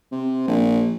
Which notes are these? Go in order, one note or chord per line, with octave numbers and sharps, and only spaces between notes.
C3
A#1